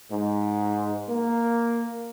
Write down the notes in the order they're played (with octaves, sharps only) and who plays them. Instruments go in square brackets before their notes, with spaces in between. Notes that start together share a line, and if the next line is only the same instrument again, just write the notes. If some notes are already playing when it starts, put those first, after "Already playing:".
[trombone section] G#2
A#3